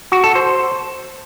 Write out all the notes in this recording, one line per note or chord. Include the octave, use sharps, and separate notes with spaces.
F#4
A4
C5